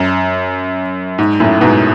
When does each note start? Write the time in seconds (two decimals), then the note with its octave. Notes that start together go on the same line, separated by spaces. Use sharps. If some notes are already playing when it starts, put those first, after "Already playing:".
Already playing: F#2
1.19 G#2
1.40 F#2 A2
1.61 G#2 B2